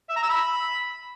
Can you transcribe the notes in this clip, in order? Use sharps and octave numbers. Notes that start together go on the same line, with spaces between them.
E5
A#5
E6
B5